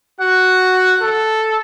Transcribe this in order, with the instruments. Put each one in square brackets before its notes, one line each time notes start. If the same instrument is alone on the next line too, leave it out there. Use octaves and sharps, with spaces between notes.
[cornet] F#4 [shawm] F#5
[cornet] A4